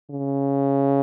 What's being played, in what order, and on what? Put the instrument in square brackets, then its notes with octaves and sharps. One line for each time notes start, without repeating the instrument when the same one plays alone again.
[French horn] C#3